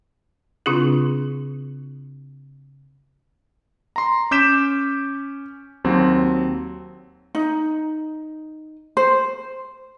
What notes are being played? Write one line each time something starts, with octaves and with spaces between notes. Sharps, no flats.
C#3 C4 D4 E4 F4 G#4
A#5 C6
C#4 D6 G6 B6 E7
D#2 F#3 C4
D#4
C5